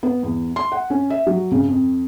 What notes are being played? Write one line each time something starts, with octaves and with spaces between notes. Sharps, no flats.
B3
E2
C6
F#5
C#4
E5
F#3
C#3
F2